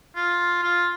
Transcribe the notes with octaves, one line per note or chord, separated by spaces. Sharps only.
F4
F4